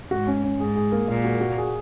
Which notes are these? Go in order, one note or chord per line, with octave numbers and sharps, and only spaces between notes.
G#2 F#4
C#4
C#4
G#2 G#4
G#4
A#3
A#2 G#3
F#4
F#4
G#4